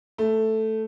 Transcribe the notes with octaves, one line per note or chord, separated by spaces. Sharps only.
A3